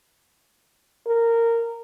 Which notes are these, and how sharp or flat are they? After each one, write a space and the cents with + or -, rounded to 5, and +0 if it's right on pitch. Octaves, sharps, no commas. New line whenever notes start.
A#4 -15